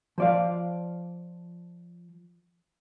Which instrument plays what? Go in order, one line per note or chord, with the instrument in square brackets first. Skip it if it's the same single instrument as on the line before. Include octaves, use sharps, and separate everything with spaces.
[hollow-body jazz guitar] F3 D5 F5